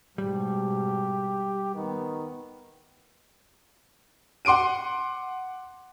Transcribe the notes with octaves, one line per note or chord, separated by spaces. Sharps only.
G#2 B2 G3 G4
D#3 B3
F#5 C6 D6 D7 D#7